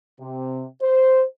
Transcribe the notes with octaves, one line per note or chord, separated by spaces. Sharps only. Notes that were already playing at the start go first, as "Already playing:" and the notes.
C3
C5